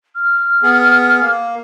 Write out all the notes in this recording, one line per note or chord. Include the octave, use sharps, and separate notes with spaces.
F6
B3 G#4
A#3